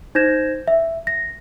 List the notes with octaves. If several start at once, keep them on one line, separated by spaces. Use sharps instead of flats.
D#4 C5 G6 G#6 A#6 E7
E5
A#6